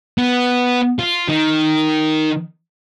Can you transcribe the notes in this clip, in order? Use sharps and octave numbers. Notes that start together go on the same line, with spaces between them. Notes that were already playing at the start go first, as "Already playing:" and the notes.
B3
F4
D#3